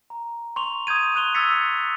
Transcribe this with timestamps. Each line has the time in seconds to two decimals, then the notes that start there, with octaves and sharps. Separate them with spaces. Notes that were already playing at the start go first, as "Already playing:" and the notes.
0.10 A#5
0.56 C6 C#6 F7
0.87 D#6 G6 G#6 D#7
1.15 C6 D#6 F#6 D#7 F7 G7
1.35 E6 F#6 G#6 A6 B6 C#7
1.52 E6 G#6